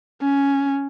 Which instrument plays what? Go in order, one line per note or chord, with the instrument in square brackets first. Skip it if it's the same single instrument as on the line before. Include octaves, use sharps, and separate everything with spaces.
[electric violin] C#4